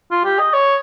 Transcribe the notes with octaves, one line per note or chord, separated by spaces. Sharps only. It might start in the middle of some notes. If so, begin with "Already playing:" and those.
F4
G4
D#5
C#5